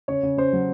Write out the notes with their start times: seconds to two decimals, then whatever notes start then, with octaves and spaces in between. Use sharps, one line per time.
0.08 C#3 C#5
0.23 C#3
0.37 C#3 C5
0.53 F#3